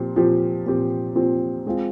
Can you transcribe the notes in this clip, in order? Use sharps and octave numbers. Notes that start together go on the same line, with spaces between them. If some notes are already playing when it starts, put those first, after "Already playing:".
Already playing: A#2 F3 C4 G4
A#2 F3 C4 G4
A#2 F3 C4 G4
A#2 F3 C4 G4
G#3 C4 F4